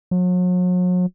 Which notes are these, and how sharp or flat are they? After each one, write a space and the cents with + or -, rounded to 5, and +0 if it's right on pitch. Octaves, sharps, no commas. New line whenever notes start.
F#3 -40